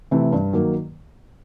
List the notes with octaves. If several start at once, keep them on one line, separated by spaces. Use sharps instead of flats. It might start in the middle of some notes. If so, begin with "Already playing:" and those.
C3 E3 A3
G2
D#3 F#3 A#3